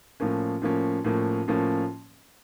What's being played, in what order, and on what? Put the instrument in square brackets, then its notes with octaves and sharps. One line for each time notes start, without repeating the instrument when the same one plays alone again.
[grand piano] A2 F3 A#3 C#4
A2 F3 A#3 C#4
A2 F3 A#3 C#4
A2 F3 A#3 C#4